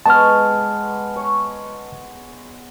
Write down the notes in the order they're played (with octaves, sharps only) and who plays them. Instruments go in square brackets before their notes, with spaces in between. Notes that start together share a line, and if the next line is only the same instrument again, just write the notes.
[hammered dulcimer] G#3 B3 C#5 [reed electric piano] A5 F6
[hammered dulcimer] C#5